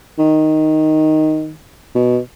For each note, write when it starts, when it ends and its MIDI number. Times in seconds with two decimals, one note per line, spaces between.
0.18 1.52 51
1.95 2.19 47